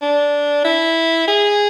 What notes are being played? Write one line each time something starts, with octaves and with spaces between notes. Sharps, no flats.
D4
E4
G#4